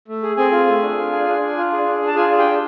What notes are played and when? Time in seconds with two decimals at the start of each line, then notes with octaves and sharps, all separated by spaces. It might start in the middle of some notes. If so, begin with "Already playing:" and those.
0.08 A3
0.23 G#4
0.37 C4 G#4 G#5
0.52 F4
0.67 A3
0.82 D4
0.98 F4
1.12 G#4
1.27 D4
1.41 D4
1.57 F4
1.72 G#4
1.86 D4
2.02 D4
2.07 A5
2.16 F4 G#4 G#5
2.32 G#4
2.38 G4 G5
2.46 D4